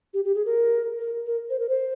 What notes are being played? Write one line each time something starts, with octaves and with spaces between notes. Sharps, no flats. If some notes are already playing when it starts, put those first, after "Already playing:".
G4
G4
G#4
A#4
A#4
A#4
C5
A#4
C5